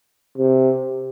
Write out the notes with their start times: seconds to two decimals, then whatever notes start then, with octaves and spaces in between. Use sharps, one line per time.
0.38 C3